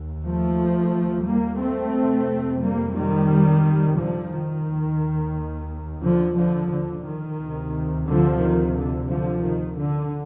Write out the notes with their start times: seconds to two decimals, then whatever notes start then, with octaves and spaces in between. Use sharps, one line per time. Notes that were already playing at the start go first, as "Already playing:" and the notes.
Already playing: D#2
0.23 F3 A3
1.24 G3 A#3
1.59 A3 C4
1.93 F2 C3
2.61 G3 A#3
2.95 D#3 G3
3.97 D3 F3
4.31 D#3
4.66 D#2
6.02 D3 F3
6.37 D3 F3
6.70 D3
7.05 D#3
7.39 D2 C3
8.07 D3 F3
8.41 D#3
8.75 D3
9.09 D3 F3
9.43 D#3
9.78 D3